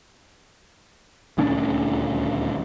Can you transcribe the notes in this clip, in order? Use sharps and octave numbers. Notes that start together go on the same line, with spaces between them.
D#1 D2 C#4 D4